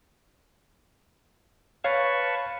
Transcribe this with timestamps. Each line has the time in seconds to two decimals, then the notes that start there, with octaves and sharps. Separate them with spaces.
1.84 B4 C#5 F5 A5 C#6